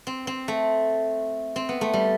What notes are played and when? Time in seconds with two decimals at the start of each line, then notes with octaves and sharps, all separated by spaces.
0.07 C4
0.27 C4
0.48 A3
1.56 C4
1.69 B3
1.81 A3
1.93 G3